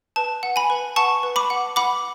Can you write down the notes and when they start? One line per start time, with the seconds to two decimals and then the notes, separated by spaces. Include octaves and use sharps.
0.16 B4 A5
0.43 F#5
0.56 G#5 B5
0.70 B4
0.96 F#5 A5 C#6
1.23 B4
1.36 B5 D6
1.50 F#5
1.76 F#5 B5 D6